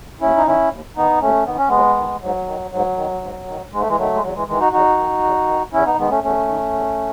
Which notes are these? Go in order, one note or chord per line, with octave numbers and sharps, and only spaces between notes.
D#2 C#4 E4
D#4
D#3 C#4 E4
D#2
D#3 B3 D#4
D#2 A3 C#4
D#3 B3
C#4
D#2 G#3 B3
D#3
G#2 F#3
D#3
G#2 F#3
D#3
G#2
D#3
G#2 G#3
A3
E3 G#3
D#3 F#3 A3
G#3
E2 F#3
E3 G#3
D#3 E3 G#3
D#4 F#4
E2 D#4 F#4
D#3
E2
D#3
E2 C#4 E4
B3 D#4
D#3 G#3 B3
A3 C#4
E2 A3 C#4
D#3
E2